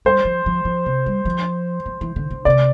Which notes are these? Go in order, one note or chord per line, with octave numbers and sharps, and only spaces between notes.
G3 C5
F3
F3
F3
C3
G3
F3
F3
E3
D3
D3
C3 D5